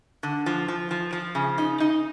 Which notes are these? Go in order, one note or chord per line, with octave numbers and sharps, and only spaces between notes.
D3
F3
F3
F3
F3
C#3
D#4
D#4